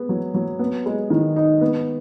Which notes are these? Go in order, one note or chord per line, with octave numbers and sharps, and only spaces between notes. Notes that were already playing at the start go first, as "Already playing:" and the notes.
Already playing: B3 G#4
F#3
F#3
B3
G#3
D#3
D#4
B3